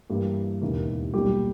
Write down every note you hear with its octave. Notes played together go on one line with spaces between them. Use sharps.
G2 E3 A#3 G4
E1 D#2 C#3 E3 A#3
B1 A#2 G3 A#3 G4